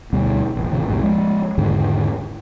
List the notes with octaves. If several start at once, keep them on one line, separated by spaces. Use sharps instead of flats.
D2 B2 G3
E1 A1
A1 F2 C3 D#3
C2 F#2 A2
F3 G#3
E2 G#2 D3 D#3